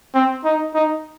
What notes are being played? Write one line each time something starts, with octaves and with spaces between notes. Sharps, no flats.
C4
D#4
D#4